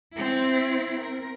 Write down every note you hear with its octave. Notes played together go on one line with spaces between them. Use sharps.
C4 E4
A#4